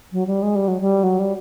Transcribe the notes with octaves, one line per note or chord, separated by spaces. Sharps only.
F#3
G3
G#3
G3
F#3
G3
F#3
G3